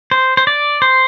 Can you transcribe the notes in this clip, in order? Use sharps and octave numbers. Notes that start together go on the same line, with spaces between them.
C5
C5
D5
C5